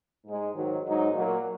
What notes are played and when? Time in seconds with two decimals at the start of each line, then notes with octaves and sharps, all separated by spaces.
0.24 G#2 G#3 D#4
0.54 G#2 D#3 F#3
0.83 G#2 F#3 D#4
1.12 A#2 F#3 A#3